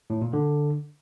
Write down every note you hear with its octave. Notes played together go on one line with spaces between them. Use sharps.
A2
A#2
D3